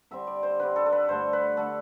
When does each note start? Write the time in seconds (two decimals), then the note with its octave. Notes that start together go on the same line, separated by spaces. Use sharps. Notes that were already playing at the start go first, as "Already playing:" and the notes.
0.11 D3 G3 C4 E5
0.27 D5
0.43 C5
0.60 D3 G3 C4 B4
0.76 A4
0.86 A4
0.92 B4
1.08 G2 D3 A3 C5
1.33 B4
1.57 D3 A3 A4